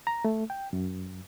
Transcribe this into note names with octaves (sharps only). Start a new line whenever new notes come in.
A#5
A3
G5
F#2